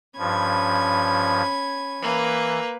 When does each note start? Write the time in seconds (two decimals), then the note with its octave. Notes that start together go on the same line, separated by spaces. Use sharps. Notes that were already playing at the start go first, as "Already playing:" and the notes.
0.18 G2 F3 C#4 B5 G#6
2.01 E3 A#3 B4